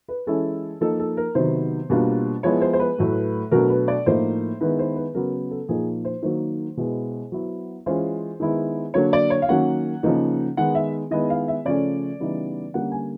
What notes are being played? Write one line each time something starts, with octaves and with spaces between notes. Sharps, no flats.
B4
E3 G#3 C#4 E4 A4
F3 A#3 D#4 A4
A4
A#4
C3 D#3 F#3 B3 C5
B2 G3 A#3 D4 F4
F3 G#3 B3 E4 C#5
C5
C5
B4
A2 F#3 A3
B2 F#3 A3 D4 A#4
B4
D5
A2 F3 A#3 D#4 C5
D#3 G#3 B3 E4 B4
C5
B4
C#3 F#3 B3 A#4
A4
A#2 F3 A#3 D#4 G#4
C5
D#3 F#3 A#3 D#4 C5
B2 G#3 B3 E4
F#3 B3 E4
E3 G#3 C#4 F4 C5
D#3 G#3 B3 E4
D3 F#3 A#3 D4 C#5
D5
C#5
F5
D#3 F#3 A#3 C#4 F#5
C#3 F3 A#3 D#4
D#3 G#3 B3 F#5
E5
D#3 G#3 B3 E4 D#5
F5
E5
C#3 F3 A3 C#4 D5
C#3 E3 G3 B3 D#4
D3 G3 A#3 C#4 F#5
G#5